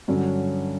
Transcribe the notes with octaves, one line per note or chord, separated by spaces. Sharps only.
G2 D3 F#3 C#4